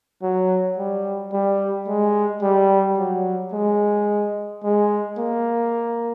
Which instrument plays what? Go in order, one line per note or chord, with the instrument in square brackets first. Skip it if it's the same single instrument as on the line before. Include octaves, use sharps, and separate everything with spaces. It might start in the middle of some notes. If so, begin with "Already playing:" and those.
[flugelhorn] F#3
G3
G3
G#3
G3
F#3
G#3
G#3
A#3